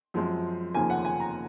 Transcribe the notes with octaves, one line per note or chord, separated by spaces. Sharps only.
F#2 F3 G#3 C4
F1 D#2 C#3 F3 A#3 G#5
F#5
G#5
A#5